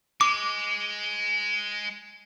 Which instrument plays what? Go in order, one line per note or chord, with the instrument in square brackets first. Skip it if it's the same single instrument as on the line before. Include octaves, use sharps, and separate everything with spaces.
[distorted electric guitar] G#3 [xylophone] D6